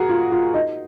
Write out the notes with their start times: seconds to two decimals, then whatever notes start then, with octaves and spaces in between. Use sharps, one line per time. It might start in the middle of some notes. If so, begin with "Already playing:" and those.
Already playing: F#4 G#4 A#4
0.09 F4
0.32 F4
0.54 D#4